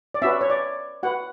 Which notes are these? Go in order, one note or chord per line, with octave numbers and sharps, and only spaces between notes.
D5
C#4 F#4 B4 E5
C#5
D5
F#4 B4 F#5